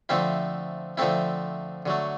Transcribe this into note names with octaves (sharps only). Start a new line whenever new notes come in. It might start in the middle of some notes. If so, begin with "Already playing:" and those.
D3 F3 A3 C4 E4
D3 F3 A3 C4 E4
D3 F#3 A3